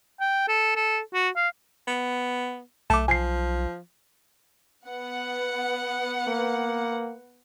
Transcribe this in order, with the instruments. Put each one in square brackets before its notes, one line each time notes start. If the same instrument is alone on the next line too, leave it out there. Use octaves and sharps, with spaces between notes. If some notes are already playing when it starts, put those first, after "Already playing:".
[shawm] G5
A4
A4
F#4
F5
[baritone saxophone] B3
[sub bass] B1 [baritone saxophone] A3 [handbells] A5 D6
[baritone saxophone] F3 [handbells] G#5 C7
[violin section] B3 F#5
[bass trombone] A#3